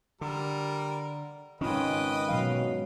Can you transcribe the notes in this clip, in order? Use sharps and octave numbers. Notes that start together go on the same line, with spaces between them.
D3 G3 A#4
G#2 D#3 C#4 F4 B4 D#5 G5
B2 F#3 F5